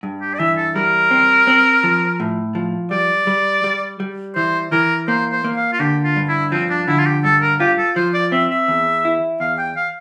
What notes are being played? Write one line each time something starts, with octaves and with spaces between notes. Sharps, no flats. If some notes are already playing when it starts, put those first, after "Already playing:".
G2
G4
D5
E3 E5
A4
G3 A#4
C4
C4
F3
A2
F3
G3 D5
G3
G3
G3
E3 C5
E3 A#4
A#3 C5
C5
A#3
F5
F4
D3 G4
F4
G2
E4
F3 C4
D4
D3 E4
F4
G4
G2 A4
A#4
F4 G4
A4
F3 C5
D5
C4 E5
E5
E2
E4
E2 F5
G5
F5